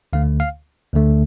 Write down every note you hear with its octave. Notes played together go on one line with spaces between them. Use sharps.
D2 D3 A3 F5
F5
D2 D3 A3